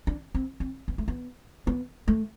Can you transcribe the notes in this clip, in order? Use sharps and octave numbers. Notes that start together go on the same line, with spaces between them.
D4
C4
C4
B3
A3
B3
B3
A3